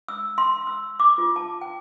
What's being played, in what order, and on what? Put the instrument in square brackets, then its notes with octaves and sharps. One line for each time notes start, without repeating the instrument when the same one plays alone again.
[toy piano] E6
C6
E6
D6
F4
A5
G5